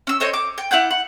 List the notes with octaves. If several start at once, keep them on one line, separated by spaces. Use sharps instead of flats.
C#4 E6
A4 C5 C#5 D#5
D6
G5
E4 D5 F#5 G6
F#5